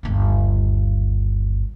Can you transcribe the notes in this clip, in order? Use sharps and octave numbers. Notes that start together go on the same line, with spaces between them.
G1 D#2